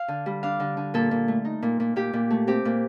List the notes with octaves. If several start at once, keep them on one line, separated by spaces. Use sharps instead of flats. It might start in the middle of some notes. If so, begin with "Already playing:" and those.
Already playing: F5
D3
G3
D4 F5
D3
D3
A#2 A4
A#2
A3
D#4
A#2
A#2
A#2 G4
A#2
A3
C4 G4
A#2